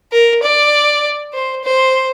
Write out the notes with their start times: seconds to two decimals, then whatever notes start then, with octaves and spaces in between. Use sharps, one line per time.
0.12 A#4
0.43 D5
1.33 C5
1.64 C5